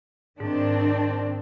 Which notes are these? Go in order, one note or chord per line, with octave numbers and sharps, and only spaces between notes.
G#2 D#3 C4 D4